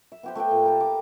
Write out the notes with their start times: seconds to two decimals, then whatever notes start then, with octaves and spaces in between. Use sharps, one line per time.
0.12 E5
0.23 B3 G4 C5
0.35 A3 G4 B4 G5
0.51 A#2
0.64 G4 A4 A#4
0.80 D6